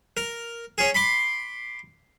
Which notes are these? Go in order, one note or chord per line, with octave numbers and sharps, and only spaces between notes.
A#4
C#4 G#4
B5 C6 D6